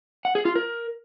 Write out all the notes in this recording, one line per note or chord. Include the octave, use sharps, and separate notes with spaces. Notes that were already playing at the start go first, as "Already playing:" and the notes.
F#5
G#4
F4
A#4